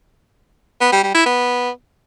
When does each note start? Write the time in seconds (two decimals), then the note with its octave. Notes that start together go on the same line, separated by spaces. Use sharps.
0.81 B3
0.92 G3
1.03 G3
1.15 E4
1.26 B3